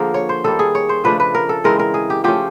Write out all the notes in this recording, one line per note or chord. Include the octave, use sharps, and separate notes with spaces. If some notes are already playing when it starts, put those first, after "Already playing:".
Already playing: D3 F3 A#3 G#4 A#4
C#5
C5
D#3 G3 A#3 A4
G#4
C#5
C5
C#3 F3 A3 D4 B4
B4
A#4
A4
C#3 E3 G#3 C4 A#4
A#4
G#4
G4
F3 A3 C#4 G4